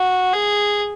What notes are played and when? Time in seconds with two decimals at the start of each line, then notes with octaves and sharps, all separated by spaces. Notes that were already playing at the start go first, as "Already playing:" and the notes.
Already playing: F#4
0.33 G#4